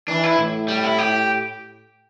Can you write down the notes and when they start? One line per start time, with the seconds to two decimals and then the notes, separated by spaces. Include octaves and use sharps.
0.08 E3 D4
0.24 E4
0.38 A2
0.68 G3
0.84 E4
0.98 G4